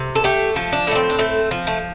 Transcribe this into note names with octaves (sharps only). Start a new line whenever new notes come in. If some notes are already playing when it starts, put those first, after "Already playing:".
Already playing: C3
A4
A3 G4
F3
D4
A2 A3
C4
D4
A3 C4
F3
A3